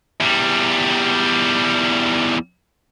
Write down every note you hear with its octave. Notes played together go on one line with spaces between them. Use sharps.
E2 G3